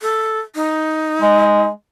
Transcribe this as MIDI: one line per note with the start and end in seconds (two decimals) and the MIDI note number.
0.02 0.39 69
0.55 1.65 63
1.21 1.69 56